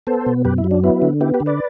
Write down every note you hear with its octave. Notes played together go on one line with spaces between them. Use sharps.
B3 A4 C5
B2
F#2 G4 B4
E4
F#3
D4
B3 E4
D3
B3 E4 G4
G4 B4
D3
B4 D5